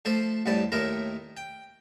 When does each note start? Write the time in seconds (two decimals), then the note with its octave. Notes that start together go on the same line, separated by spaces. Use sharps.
0.05 F3 A3 A4 C5
0.46 A1 F2 A2 G3 A5 B5
0.72 D#2 A2 A3 E4 A#4 A#5
1.37 G5